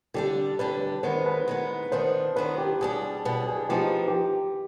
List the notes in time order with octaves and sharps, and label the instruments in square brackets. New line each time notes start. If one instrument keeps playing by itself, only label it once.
[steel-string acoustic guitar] D3 G3 D4 [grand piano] G4
[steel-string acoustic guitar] D3 G3 D4 [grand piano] B4
[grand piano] B4
[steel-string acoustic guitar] D#3 G#3 B3 [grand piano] C5
[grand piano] B4
[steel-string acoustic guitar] D#3 G#3 B3
[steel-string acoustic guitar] D#3 B3 D4 [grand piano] C5
[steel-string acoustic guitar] D#3 B3 D4 [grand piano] B4
[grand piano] G4
[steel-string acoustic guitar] B2 G3 D4 [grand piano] G#4
[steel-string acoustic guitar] B2 G3 D4 [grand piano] B4
[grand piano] G#4
[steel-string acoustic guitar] F3 B3 D#4 [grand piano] G4
[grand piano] G4